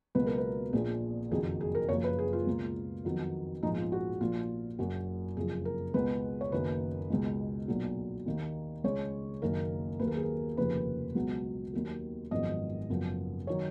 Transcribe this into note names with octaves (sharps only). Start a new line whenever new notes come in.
C#2 B2 F#3 A#3 B4
A#4
B4
A#1 A#2 F3 A#3 G#4
F#1 F2 D#3 F#3 G#4
G#4
A#4
F#1 F#2 F3 A#3 C#5
B4
G#4
F4
C#2 B2 A#3
F2 D#3 F#3 B3
A#1 G#2 F3 G#3 B3 D#4
F4
F#4
A#1 A#2 F3 F4
F#1 F#2 C#3 F#4
F#1 F2 F3 G#4
A#4
C#2 B2 G#3 B3 B4
C#5
F#1 F#2 D#3 A#3 B4
C#2 B2 G#3
B1 A#2 F#3 A#3
D#2 D#3 A#3
C#2 C#3 G#3 C#5
F#1 F#2 D#3 A#3 A#4
D#2 D#3 F#3 A#3 B4
A#4
G#4
A#4
F1 D#2 C#3 F3 B4
C#2 B2 F#3 B3
D#2 D#3 F#3
G#1 F#2 F3 G#3 B3 D#5
F#1 F#2 F3 B3
D#3 F#3 C#5